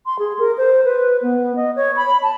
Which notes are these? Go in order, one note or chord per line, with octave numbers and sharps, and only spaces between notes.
C6
G#4
A#4
C5
B4
B3
D#5
C#5
B5
A5